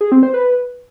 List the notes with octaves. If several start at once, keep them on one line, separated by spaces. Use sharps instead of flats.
G#4
C4
C5
B4